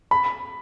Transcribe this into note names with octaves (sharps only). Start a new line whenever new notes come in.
B5